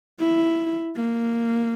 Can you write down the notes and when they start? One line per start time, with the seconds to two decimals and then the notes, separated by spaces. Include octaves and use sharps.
0.19 E4
0.96 A#3